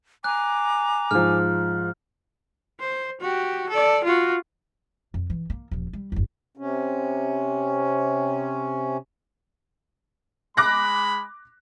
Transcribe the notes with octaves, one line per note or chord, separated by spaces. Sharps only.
G#5 A#5 D6 F#6
G#2 F3 F6
C5
F#4 G4
A4 D5
F4 F#4
F2
E3
A#3
D#1 F3
G3
G1 E2
C3 C#4
G#3 B5 D6 F#6 A#6